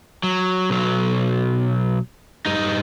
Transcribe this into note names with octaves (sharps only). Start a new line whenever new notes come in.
F#3
B1 F#3
G2 D#4